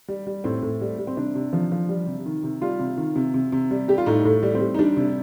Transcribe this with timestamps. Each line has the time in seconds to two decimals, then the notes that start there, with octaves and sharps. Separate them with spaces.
0.08 G3
0.27 G3
0.44 A2 C4
0.63 A2
0.81 G3
0.99 G3
1.07 C4
1.17 C3 D4
1.35 C3
1.53 F3
1.72 F3
1.89 G3
2.07 C3
2.26 D#3
2.44 C3
2.62 G3 F4
2.80 C3
2.97 D#3
3.16 C3
3.34 C3
3.52 C3
3.71 G3
3.88 G3 G4
3.98 F4
4.06 A2 D#4
4.25 A2
4.43 G3
4.54 C4
4.61 G3
4.74 D#4
4.79 G3 D4
4.97 C3